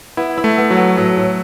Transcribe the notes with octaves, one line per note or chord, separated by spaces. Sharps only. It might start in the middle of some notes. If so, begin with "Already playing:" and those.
B3 E4
E4
A3
B3
F#3
B3
A2 F#3
A2